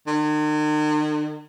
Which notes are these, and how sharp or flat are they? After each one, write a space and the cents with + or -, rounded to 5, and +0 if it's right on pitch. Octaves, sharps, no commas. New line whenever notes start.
D#3 -45